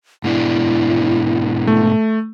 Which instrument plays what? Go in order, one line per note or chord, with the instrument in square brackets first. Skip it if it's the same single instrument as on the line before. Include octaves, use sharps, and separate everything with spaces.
[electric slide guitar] G#2 B2 D4 [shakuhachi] E4
[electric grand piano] A3